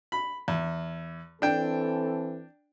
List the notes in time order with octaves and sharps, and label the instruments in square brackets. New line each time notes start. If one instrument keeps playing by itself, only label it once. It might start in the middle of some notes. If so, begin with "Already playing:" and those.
[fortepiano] B5
E2
[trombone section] E3 C4 A4 [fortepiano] D4 G5